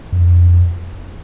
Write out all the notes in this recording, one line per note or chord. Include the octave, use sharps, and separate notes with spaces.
F2